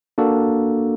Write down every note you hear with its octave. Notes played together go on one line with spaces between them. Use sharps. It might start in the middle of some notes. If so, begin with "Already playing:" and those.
A#3 D4 F#4 A4